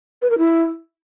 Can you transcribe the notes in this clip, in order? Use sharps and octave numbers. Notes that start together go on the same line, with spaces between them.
B4
A#4
E4